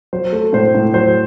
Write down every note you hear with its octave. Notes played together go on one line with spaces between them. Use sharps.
F#3 C5
A3
A2 C5
A2
F#3 C5